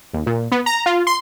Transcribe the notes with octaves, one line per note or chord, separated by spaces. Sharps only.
D#2
A#2
B3
A#5
F4
C6